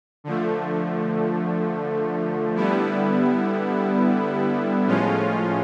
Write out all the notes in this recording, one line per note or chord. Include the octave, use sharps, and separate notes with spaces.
D3 F3 A3
D3 G3 B3 E4
A2 F3 G#3 C#4 F4